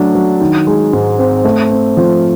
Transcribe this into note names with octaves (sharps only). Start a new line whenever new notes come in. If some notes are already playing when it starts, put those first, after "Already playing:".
Already playing: F#3 A3 D4
F#3
D#3
G#3
G#2
C4
A3
C4
F3